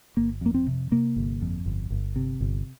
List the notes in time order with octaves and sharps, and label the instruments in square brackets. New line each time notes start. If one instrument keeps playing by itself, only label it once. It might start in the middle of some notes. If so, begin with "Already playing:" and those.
[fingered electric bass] G1 A#3
F2 A#3
C4
C3
C3 A#3
G1
F2
G1
G1
C3
G1